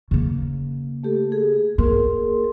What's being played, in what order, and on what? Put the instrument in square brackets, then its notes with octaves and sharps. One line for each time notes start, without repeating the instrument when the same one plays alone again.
[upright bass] C#3 A#3
[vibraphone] A3 G4 A4
G#4
[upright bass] A#3 [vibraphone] G#4 A#4 C6